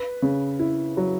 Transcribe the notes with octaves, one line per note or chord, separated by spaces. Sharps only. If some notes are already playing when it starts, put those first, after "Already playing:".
Already playing: B4
C#3
E4
F#3